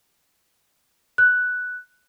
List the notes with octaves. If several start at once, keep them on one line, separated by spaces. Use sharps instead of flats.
F#6